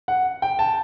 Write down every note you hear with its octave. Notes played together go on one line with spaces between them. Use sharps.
F#5
G5
A5